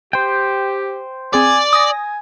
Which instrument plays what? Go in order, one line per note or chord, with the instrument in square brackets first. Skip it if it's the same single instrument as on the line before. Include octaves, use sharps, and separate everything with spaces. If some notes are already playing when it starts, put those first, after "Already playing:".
[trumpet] G4 [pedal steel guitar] C5 G5
[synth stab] C4 G#4 [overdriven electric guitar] D5 [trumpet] G#5
[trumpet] G#5 [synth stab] D#6 A#6